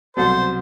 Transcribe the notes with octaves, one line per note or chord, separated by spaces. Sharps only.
C2 B2 F#3 C4 A4 C5